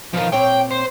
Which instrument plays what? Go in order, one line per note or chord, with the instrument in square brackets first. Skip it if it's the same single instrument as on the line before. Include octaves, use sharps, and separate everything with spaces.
[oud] B2 D#3 [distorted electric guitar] F3 F4
[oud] A#2 C4 C#5 [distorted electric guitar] G5
[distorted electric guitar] C5